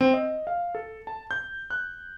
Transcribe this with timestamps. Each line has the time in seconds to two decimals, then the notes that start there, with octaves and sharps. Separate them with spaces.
0.01 C4
0.14 D#5
0.47 F5
0.75 A4
1.07 A5
1.31 G6
1.70 F#6